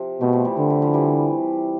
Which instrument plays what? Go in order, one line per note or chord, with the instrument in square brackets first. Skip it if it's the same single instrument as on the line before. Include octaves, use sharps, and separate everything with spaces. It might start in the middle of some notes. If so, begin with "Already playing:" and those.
Already playing: [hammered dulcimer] C3 F3
[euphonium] B2 [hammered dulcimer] A3 C4
[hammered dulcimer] F3 A3
E3 G3
[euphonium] D3 [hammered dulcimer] F3
[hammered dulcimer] E3
F3
E3 G3